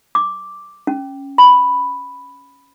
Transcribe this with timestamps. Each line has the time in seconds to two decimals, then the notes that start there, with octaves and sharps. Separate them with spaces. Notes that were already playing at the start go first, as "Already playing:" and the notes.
0.15 D6
0.87 C#4
1.38 B5